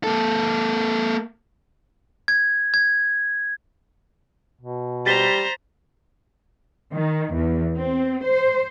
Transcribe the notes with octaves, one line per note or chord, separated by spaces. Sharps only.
A#3 A4
G#6
G#6
B2
G3 C5 A#5 A6 B6 G7
D#3
E2
C4
C5